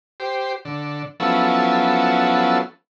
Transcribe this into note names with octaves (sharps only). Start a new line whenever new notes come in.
G4 C5
D3
F3 F#3 B3 C#4 E4 A4